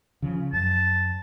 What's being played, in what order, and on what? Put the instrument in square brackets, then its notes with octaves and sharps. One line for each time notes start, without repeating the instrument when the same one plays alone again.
[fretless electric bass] C#3 F3
[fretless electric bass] F#2 [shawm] A5